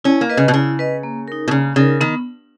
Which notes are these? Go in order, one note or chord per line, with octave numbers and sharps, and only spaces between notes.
C#4 E4
A#3
B4 D#5
C#3
B2
C#3 E4
B4 D#5
A#3
D#4 A#4
B2
C#3 A#3
C#3 D#4 A#4
D#3 B3